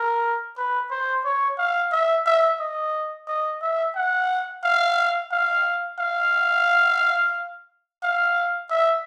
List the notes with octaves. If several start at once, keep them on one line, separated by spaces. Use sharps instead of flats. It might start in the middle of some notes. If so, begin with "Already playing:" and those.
Already playing: A#4
B4
C5
C#5
F5
E5
E5
D#5
D#5
E5
F#5
F5
F5
F5
F5
E5